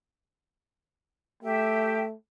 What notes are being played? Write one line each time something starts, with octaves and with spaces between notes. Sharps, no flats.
A3 G4 E5 G5